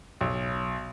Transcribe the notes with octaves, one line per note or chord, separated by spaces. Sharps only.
B1